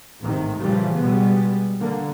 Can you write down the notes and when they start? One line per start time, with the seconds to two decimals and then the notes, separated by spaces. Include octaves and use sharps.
0.21 A1 G#2 C3 D#3
0.62 A#2 C#3 E3 F3 G3
0.98 B2 G3 G#3 B3
1.79 D3 A#3